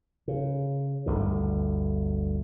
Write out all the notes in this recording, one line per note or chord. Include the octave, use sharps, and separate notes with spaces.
C#3
G1 D2 D3